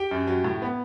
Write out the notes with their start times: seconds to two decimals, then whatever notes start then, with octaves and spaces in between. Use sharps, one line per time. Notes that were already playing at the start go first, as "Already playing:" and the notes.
Already playing: G4 G5
0.11 F#2
0.27 F#3
0.44 A2
0.62 B3